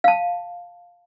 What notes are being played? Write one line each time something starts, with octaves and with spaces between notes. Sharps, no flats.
F5 A5